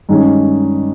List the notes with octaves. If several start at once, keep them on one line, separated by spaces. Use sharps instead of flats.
G2 D#3 G#3 C#4